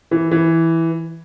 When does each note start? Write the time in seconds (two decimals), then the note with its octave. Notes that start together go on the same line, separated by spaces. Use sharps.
0.11 E3
0.31 E3